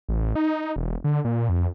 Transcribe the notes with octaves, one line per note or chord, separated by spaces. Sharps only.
A1
D#4
E1
D3
A#2
F2